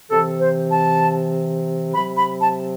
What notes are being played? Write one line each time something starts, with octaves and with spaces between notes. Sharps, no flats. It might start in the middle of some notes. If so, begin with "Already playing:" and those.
C3 E3 A4
C5
A5
C3 F#3 B5
B5
A5